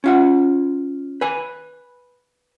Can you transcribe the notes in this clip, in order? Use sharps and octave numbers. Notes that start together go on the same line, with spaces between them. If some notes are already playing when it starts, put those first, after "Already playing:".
C#4 F4 F#5
B4 G#5